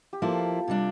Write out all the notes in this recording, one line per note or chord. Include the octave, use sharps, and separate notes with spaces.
G4
F3 A#3 E4 F4 A4
C3 G3 D4